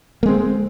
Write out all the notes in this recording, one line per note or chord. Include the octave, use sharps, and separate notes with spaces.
G#3 A#3 C4